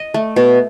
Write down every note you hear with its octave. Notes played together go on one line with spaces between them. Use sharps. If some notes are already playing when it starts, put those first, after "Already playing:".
Already playing: D#5
A3
B2